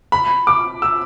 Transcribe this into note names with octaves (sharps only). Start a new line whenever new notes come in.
B5
D6
E6